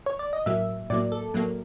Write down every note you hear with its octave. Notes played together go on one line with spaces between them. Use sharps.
C#5
D5
D#5
A2 F#3 A#3 E5
A2 F#3 A#3 D5
A4
A2 F#3 A#3